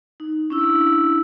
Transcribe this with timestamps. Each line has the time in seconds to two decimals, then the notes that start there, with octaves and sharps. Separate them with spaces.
0.20 D#4
0.50 C#4 D4 E4 E6